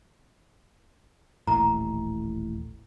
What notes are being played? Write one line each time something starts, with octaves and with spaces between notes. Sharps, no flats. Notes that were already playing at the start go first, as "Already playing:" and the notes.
D#1 A1 A2 A#5